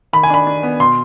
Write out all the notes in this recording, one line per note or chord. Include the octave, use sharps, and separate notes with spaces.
D#3 B5
G#5
D4 B5
D4
B3
B2 C6